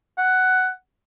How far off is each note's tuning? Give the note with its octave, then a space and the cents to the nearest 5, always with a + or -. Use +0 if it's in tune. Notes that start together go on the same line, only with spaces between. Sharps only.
F#5 +10